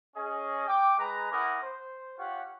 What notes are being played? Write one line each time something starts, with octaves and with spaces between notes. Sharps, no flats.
C#4 G#4 D#5
G5 D6
G#3 B4 A#5
C#4 E4 A#4 F#5 D6 D#6
C5
F4 G4 C#5 F#5